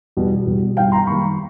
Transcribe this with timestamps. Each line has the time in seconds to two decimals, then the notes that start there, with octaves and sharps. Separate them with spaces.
0.17 E2 B2 G3
0.47 E2 B2 G3
0.77 G2 E3 G3 F5 G5
0.92 A#5 C6
1.07 F#2 D#3 G3 A#3 B5 C#6